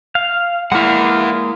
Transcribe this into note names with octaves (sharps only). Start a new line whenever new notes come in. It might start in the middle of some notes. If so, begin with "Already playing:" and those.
F5
G#3 A#3 E4 F5 F#5